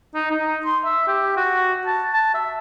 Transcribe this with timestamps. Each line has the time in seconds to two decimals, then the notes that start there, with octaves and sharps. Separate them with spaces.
0.15 D#4
0.31 D#4
0.65 C6
0.85 E5
1.08 G4
1.37 F#4
1.87 A5
2.13 A5
2.34 E5